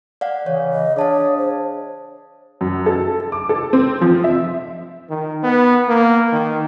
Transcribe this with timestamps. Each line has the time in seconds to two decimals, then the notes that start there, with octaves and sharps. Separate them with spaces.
0.21 D5 F5 F#5
0.46 C#3 E3 C#5
0.73 D#5
0.96 D4 G#4 C#5 F5 A5 D6
1.38 C5
2.61 F#2
2.86 A4
3.32 D6
3.49 A4
3.73 C4
4.01 F3
4.24 E5
5.10 D#3
5.43 B3
5.88 A#3
6.33 D#3